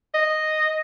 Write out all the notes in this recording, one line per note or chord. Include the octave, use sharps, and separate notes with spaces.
D#5